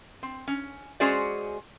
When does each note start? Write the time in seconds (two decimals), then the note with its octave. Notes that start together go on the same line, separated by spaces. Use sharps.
0.23 C4
0.48 C#4
1.00 G#3 C#4 F#4 G#4 C5 D5